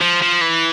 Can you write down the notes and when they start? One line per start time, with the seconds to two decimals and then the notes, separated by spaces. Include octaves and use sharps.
0.01 F3
0.22 F3
0.41 E3